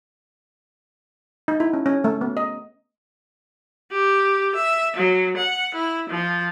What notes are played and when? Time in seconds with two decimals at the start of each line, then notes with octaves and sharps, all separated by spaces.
1.48 D#4
1.60 E4
1.73 C#4
1.86 C#4
2.04 A3
2.21 B3
2.37 D#5
3.91 G4
4.55 E5
4.96 F#3
5.37 F#5
5.74 E4
6.09 F3